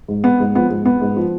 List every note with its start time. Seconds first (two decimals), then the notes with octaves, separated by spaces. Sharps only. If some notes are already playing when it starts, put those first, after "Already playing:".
0.08 G#2
0.24 B3
0.40 G#2
0.55 F3 B3
0.70 G#2
0.85 B3
1.01 G#2
1.17 F3